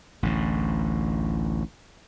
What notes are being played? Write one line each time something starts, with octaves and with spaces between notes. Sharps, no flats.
A1 D2 A2